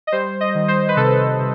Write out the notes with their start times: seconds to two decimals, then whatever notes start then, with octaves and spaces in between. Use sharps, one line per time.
0.07 D#5
0.12 G3 C5
0.41 D#5
0.55 D#3
0.68 C5
0.89 B4
0.96 C3 A4
1.40 C3